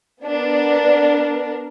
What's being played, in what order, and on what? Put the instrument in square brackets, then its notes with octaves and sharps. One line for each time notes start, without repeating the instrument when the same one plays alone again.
[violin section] B3 D4 A#4